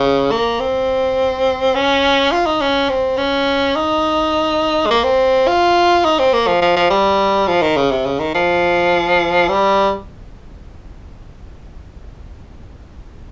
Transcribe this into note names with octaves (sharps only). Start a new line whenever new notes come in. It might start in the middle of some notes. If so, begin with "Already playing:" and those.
Already playing: C#3
A#3
C4
C#4
F4
D#4
C#4
C4
C#4
D#4
G#3
A#3
C4
F4
D#4
C4
A#3
F3
F3
F3
G3
F3
D#3
C#3
C3
C#3
D#3
F3
G3